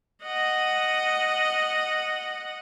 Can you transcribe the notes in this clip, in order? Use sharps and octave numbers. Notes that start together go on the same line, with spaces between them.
D#5 F#5